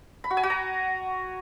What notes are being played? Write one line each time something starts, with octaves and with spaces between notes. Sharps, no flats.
B5
F#4
G#5
F#4
A#5